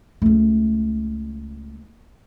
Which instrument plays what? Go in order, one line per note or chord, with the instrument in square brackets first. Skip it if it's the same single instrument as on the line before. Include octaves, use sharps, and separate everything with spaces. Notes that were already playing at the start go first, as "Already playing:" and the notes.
[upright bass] C#2 A3